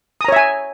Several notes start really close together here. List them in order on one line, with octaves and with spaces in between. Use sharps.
D#6 A#5 C#5 E5 G#5